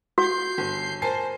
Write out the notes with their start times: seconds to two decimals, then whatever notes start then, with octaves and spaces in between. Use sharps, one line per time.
0.18 F#4 G6 C7
0.58 G1
1.02 A#4 C5 G#5 A5 C7